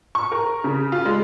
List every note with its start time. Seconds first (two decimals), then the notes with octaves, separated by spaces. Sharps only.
0.15 C#6
0.32 A#4
0.64 C#3
0.92 F4
1.05 G#3